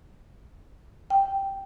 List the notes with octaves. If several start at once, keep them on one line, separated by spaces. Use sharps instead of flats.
G5